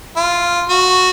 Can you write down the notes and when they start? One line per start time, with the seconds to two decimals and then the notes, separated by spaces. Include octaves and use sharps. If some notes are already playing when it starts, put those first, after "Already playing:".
0.16 F4
0.69 F#4